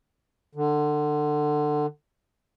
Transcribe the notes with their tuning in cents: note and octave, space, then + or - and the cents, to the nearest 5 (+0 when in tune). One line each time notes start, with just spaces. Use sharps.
D3 +25